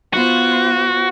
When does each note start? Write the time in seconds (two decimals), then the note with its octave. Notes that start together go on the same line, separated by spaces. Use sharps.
0.14 B3 F4 F#4 C5